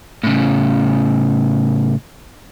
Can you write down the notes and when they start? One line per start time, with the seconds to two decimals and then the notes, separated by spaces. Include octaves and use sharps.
0.23 A2 C#3